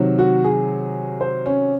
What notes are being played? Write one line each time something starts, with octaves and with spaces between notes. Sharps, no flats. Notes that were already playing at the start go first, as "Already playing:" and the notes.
Already playing: C3 D#3 F#3
F#4
G#4
C5
C#4